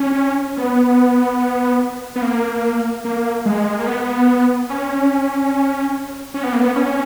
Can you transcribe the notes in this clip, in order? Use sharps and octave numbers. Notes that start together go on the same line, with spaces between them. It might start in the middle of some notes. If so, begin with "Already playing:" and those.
Already playing: C#4
B3
B3
A#3
A#3
G#3
A#3
B3
C#4
C#4
B3
A#3
B3
C#4